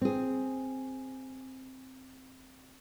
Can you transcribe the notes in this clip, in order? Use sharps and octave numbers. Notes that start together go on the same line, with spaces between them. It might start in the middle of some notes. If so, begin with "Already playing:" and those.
C4 G#4